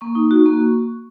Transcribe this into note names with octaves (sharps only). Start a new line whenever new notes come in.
A#3 C#6
D#4
F#4
A#3